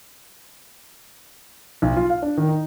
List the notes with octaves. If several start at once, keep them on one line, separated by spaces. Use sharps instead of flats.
B1
F4
F5
D4
D#3
D#4